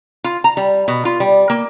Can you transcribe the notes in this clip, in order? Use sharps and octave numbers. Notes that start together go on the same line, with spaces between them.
F4
A#5
G3
B2
F4
G3
A#3